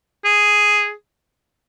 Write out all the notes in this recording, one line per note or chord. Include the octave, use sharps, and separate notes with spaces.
G#4